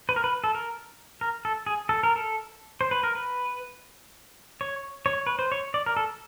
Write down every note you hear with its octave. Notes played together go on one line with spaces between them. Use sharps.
B4
A#4
B4
A4
A#4
A#4
A4
G#4
A4
A#4
A4
C5
B4
A#4
B4
C#5
C#5
B4
C5
C#5
D5
A#4
A4